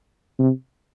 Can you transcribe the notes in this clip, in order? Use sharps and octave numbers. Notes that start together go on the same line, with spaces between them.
C3